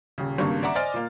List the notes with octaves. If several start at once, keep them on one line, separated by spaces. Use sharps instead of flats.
D#1 C#3
G#1 G2 C#3 A#3 D4 C#6
D5 E5 F#5 A#5 D6
C5 D5 D#5 G#5 F6 A6
A#2 A#3